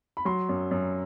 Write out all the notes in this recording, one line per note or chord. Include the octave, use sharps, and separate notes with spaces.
B5
F#3 C6
F#2
F#2